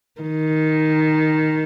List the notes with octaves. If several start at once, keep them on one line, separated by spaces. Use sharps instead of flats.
D#3